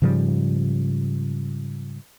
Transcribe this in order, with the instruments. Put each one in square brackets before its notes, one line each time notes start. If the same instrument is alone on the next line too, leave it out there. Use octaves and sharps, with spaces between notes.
[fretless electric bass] G#2 C#3 F3 G3